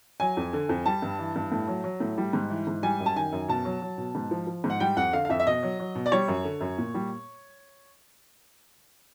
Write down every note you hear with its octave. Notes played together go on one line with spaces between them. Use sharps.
F#3 G#5
F2
D3
F2
G3 A5
G2
E3
G2
A2
F#3
F#3
A2
G3
G#2
E3
G#2
G3 G#5
F#2
A5
D#3 G#5
F#2
B2 A5
F#3
F#3
B2
G#2
F3
F3
G#2
F#5
G3 G5
F2 F#5
D3 F5
F5
F2 E5
E5
B2 D#5
F#3
F#3
B2
D5
G3 C#5
F#2
D3
F#2
A#2
G3